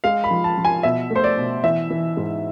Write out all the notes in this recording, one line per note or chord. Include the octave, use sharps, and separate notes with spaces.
G#3 F5
B5
F3
A5
F3
G#5
B2 E5
A3
C5
D5
B2
E3 E5
E3
G#2